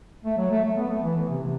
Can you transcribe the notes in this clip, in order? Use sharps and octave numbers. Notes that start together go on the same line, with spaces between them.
A3
F#3
A3
A3
B3
A3
E3
E3
C3
C3